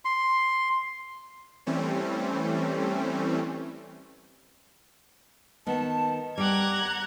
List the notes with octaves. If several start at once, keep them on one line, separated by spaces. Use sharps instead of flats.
C6
E3 G3 A3 C4 C#4
D#3 B3 A5
G3 G4 F#5 A#5 D6 G#6